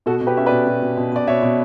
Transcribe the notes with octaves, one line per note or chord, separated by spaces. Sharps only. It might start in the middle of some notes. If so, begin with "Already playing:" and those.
B2 F#4 A4
B2
G4 B4
C#4 E5
B4 D5
B2
B2
B2
B2
B2 D5
B2 C#5 E5
B2